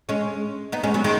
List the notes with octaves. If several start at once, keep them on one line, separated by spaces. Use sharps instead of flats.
G#3 C#4
B3 D#4
G#3 C#4
F#3 B3
D#3 G#3